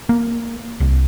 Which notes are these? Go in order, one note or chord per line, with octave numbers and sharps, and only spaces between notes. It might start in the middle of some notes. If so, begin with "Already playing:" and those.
A#3
C2